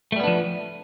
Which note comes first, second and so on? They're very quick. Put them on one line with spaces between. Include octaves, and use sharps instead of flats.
A3 G3 B3 D4 F3